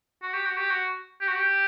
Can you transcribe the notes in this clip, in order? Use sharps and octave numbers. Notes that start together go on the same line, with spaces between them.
F#4
G4
F#4
G4
F#4
G4
F#4
G4